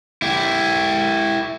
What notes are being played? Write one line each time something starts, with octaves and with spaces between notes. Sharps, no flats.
E4 G4